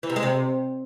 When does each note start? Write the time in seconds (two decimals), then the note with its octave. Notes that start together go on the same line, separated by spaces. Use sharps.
0.03 E3
0.10 C3
0.16 G#3
0.23 C3